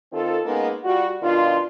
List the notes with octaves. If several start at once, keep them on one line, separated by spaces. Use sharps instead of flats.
D#3 C4 F4 A4
G#3 A#3 B3 C#4 D#4
G3 F4 F#4
B2 D#3 D4 F4